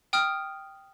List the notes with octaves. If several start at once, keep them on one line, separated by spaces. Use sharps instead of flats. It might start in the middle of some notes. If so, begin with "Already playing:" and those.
G5 D#6 F6